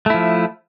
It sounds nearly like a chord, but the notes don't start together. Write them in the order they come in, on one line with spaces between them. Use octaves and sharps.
A3 E4 F3